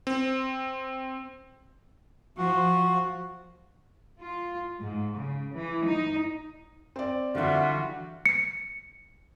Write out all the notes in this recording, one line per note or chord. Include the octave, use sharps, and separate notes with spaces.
C4
F3 F#4
F4
G#2
C#3
E3
D#4
C4 D5
D3 E3 G3 F4 F#4 E5 F#5
C#7